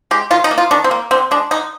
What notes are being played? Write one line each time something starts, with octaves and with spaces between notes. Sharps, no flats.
G#3 G4
D#3 F4
D#4
A#3
F4
D#3 D4
C4
A#3
D3 C4
G#3 D4
D3 D#4